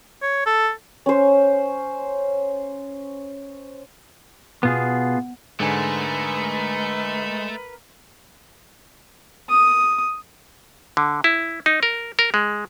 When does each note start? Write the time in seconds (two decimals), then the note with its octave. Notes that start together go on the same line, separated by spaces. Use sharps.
0.23 C#5
0.46 A4
1.06 C#4 C5
4.63 B2 B3 F4 G#4
5.60 G#2 D3 G#3 A3 A#4 B4 G#5
9.50 D#6
10.97 D3
11.24 E4
11.66 D#4
11.83 A#4
12.19 A#4
12.34 G#3